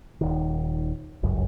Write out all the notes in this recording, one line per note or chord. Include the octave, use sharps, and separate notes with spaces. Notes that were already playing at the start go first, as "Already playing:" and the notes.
D#1 D#3
G1 C#2 F#2